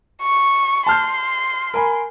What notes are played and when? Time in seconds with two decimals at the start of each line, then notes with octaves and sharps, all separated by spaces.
0.22 C#6
0.87 A5 C6 F6 G6
1.74 A#4 G#5 B5